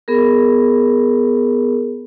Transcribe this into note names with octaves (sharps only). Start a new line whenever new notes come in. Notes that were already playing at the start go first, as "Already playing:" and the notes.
B3 G#4 A#4